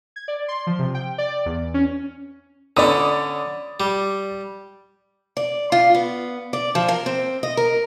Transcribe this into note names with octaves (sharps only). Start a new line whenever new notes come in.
G#6
D5
C6
F3
C3
G5
D5
E2
C#4
D3 C#4 D5 B5 D#6
G3
D5
F4
B3
D5
F3
A#4
C4
D#5
A#4